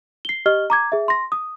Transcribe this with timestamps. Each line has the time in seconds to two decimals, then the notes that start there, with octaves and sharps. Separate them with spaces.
0.25 C7 G7
0.46 G4 D#5 F6 G7
0.70 A#5 D6 G#6
0.92 G#4 E5
1.08 C6 A#6
1.32 D#6